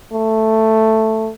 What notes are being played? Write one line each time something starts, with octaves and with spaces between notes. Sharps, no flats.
A3